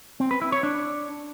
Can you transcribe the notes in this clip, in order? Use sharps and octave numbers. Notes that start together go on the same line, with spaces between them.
C4
B4
E4
C#5
D4